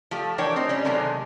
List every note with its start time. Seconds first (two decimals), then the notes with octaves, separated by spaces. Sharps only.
0.11 F3 A3 G4
0.38 E3 A3 D4 A#4 C#5 G5
0.56 C4 D#4 C5
0.69 G3 C#4
0.85 C3 D#3 F#3 G#3 A3